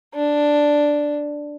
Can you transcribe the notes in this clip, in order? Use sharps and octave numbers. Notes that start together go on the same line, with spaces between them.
D4